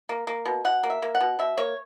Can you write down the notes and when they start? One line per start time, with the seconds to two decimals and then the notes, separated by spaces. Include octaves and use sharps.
0.09 A#3
0.27 A#3
0.45 B2
0.65 B2 F#5
0.83 A#3
0.90 E5
1.02 A#3
1.15 F#5
1.20 B2
1.39 B2 E5
1.57 A#3 C#5